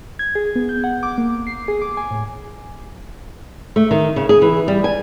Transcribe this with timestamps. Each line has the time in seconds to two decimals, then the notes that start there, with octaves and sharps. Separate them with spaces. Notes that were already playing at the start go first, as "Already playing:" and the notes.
0.19 G#6
0.35 G#4
0.56 B3
0.69 G6
0.84 F#5
1.03 D6
1.18 A#3
1.47 C7
1.68 G#4
1.82 D6
1.97 G#5
2.11 A2
3.76 A3
3.91 D#3
4.16 C#3
4.29 G#4
4.42 E3
4.68 G3
4.84 G#5